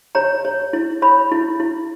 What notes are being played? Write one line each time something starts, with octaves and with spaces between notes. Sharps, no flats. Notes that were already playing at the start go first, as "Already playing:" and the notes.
C#5 A#5
C#5
E4
C#5 B5
E4
E4